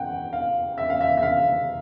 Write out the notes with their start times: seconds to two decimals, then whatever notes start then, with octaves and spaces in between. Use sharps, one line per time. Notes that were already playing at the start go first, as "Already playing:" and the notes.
Already playing: F#5 G5
0.33 F5
0.78 E5
0.90 F5
1.01 E5
1.18 E5
1.23 F5